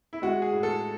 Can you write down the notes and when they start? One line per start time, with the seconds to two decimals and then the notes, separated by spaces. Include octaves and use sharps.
0.13 E4
0.22 G#3 F#4
0.42 G#4
0.53 A2
0.63 A4